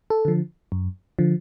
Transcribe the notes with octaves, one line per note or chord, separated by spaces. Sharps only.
A4
D3 F3
F#2
D3 F3